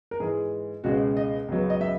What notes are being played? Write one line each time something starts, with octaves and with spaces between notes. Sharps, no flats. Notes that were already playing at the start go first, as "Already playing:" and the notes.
A#4
G#2 E3 G#3 G#4
C#2 B2 G#3 C#4 F#4
D#5
C#2 C#3 F#3 B3
D#5
E5